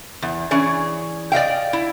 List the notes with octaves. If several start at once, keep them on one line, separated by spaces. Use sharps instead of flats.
E2
E3 C#4 G#4 D5
D5 D#5 F5 G5
E4